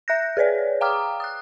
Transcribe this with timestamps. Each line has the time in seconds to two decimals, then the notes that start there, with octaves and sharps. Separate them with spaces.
0.08 E5 F#6 G6 A#6
0.37 G#4 B4 C#5 D5
0.81 F5 G5 A#5 D6 D#6 F6
1.20 D#6 F#6